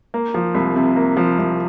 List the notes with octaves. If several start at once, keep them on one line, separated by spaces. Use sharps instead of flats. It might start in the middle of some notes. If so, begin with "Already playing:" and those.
A#3
F3
C2
C3
A#3
F3
C2